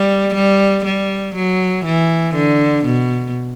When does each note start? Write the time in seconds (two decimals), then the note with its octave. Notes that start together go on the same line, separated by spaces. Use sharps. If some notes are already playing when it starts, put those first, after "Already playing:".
Already playing: G3
0.35 G3
0.85 G3
1.36 F#3
1.86 E3
2.35 D3
2.85 B2